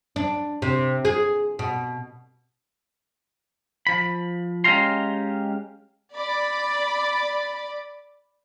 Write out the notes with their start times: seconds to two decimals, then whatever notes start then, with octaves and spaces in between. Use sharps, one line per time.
0.16 D4
0.62 C3
1.05 G#4
1.59 B2
3.87 F3 B5
4.64 G#3 C#4 G4 F5 A#5 C6
6.16 D5 B5